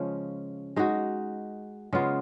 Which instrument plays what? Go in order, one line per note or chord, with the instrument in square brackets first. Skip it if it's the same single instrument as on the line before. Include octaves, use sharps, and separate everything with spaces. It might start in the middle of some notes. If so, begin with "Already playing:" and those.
Already playing: [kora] C#3 F3 G#3 C#4
G#3 D#4 F#4
C#3 G#3 B3 F4